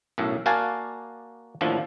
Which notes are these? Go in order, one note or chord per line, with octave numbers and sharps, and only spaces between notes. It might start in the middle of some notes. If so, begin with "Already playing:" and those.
B1 F#2 A2
A#3 F#4 D5 F5 G#5 A5
D#2 A2 D3 F3